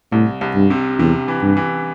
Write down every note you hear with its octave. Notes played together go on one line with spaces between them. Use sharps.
C2 A2
C2
G2
C3
E2 C3
E3
G2
E3